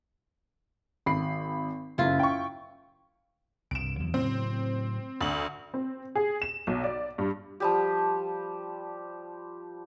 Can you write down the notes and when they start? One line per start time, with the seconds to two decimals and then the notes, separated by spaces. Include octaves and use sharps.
1.06 G#1 B5 C7
1.98 F#1 F#2 E4 F4
2.19 G5 C#6
3.71 C2 G2 D7 E7
4.00 E2 D3 F#3
4.14 A2 C#3 F#3 C4
5.21 D2 F#7
5.74 C4
6.15 G#4
6.42 E7
6.67 B1
6.84 D5
7.18 G2
7.60 F3 G3 G4